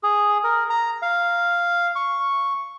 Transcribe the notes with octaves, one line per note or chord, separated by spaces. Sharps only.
G#4
A#4
A#5
F5
C#6